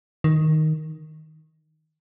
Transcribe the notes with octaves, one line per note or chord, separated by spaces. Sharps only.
D#3